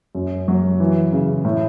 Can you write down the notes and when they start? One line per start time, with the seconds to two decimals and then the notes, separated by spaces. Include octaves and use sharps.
0.15 F#2
0.48 F#3
0.80 E3
1.12 C#3
1.45 A2